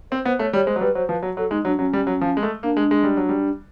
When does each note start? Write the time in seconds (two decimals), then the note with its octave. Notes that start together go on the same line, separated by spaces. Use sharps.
0.11 C4 C5
0.25 B3 C5
0.39 A3 C#5
0.53 G3 C#5
0.67 G#3 C5
0.76 F#3
0.81 G3 B4
0.95 F#3 C5
1.09 F3 B4
1.23 F#3
1.37 F#3 A4
1.51 G#3 D#4
1.65 F#3 D4
1.79 F#3 C#4
1.93 G3
2.07 F#3
2.21 F3
2.37 G#3
2.43 A3
2.63 A#3 D4
2.77 G#3
2.91 G#3
3.04 G3
3.17 F#3
3.29 G3